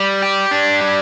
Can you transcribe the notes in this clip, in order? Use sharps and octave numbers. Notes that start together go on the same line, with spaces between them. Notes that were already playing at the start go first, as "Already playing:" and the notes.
Already playing: G3
G4
D4
G3